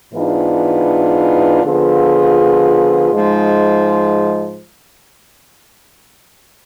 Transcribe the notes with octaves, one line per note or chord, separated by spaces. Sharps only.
G#2 E3 B3 D4 F4
D3 F3 B3 F4 G#4
G#2 F3 G#3